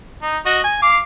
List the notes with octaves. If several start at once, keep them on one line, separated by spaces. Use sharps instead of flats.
D#4
F#4 D#5
G#5
F5 D6